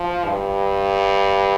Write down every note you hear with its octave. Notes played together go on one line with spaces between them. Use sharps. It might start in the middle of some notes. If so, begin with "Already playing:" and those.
Already playing: F3
G2